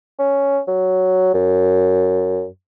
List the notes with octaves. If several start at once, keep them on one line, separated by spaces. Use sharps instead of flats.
C#4
F#3
F#2